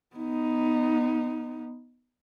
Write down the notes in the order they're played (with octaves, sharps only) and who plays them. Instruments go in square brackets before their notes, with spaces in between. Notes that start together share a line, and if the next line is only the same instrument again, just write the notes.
[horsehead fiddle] B3 D#4